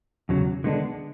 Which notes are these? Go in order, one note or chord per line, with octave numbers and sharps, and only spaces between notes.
E2 C#3 F#3
D3 G#3 B3 D4